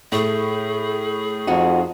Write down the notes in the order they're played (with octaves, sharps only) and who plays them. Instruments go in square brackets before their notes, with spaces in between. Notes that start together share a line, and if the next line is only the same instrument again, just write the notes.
[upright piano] A2 A3 [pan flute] G#4
[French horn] F2 [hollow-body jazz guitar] D#4 F#4